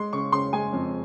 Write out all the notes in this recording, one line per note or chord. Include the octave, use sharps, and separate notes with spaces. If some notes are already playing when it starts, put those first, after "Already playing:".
Already playing: G#3 C6
C#3 C#6
C#3 C6
G#3 G#5
F2